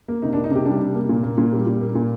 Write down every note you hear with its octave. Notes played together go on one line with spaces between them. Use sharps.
A#3
C3 D#4
D4
A#3
D#4
C3 G4
G3 D4
C3
A#3
A#2
A#3
A#2
G3
A#2
A#3
A#2